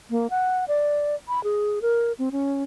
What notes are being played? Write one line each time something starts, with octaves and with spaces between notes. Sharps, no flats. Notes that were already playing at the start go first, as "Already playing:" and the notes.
A#3
F#5
D5
B5
G#4
A#4
C4
C#4